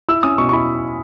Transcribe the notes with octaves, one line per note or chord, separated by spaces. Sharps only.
E4 E6
C#4 D#6
B2 C#6
C#6
E4 B5